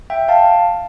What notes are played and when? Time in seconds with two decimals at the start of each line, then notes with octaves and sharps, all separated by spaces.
0.10 E5 G5
0.28 F5 A5